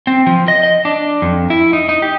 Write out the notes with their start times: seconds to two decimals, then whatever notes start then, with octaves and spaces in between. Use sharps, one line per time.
0.07 C4
0.27 F3
0.48 D#5
0.63 D#5
0.85 D4
1.22 F2
1.50 E4
1.73 D#4
1.89 D#4
2.02 G4